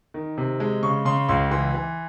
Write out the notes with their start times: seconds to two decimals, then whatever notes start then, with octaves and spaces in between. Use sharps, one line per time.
0.14 D#3
0.38 C3
0.60 G#3
0.83 C#3 C#6
1.05 C#3 C6
1.28 C#2 C6
1.51 E3 C6
1.74 E3